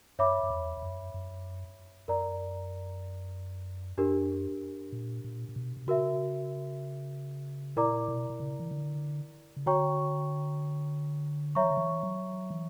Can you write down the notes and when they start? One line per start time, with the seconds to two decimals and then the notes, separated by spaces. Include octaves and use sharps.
0.19 F#2 C#5 E5 B5 D6
0.43 F#2
0.50 E2
0.77 E2
0.82 F#2
1.14 F#2
2.08 F#2 A#4 D5 A#5
3.97 F#2 D4 G4 A#4
4.92 A#2
5.24 A#2
5.49 A#2
5.56 B2
5.77 B2
5.87 C#3 F#4 A#4 E5
7.76 A#2 E4 A#4 D5 A#5 D6
8.08 B2
8.30 B2
8.40 C#3
8.60 E3
8.71 D3
9.57 C#3
9.66 D3 F#4 C#5 G5 A#5 C#6
11.55 F#3 C#5 E5 A#5 C#6
11.64 E3
11.70 D3
11.77 E3
12.03 F#3
12.50 E3